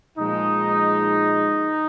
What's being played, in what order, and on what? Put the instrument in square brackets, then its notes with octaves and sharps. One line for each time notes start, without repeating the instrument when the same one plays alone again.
[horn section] A#2 F3 G#3 D#4